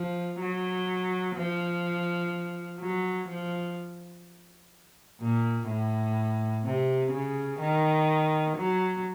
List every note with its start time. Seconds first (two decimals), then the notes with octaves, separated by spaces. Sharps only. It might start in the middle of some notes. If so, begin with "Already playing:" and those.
Already playing: F3
0.40 F#3
1.35 F3
2.79 F#3
3.28 F3
5.21 A#2
5.68 A2
6.64 C3
7.12 C#3
7.60 D#3
8.56 F#3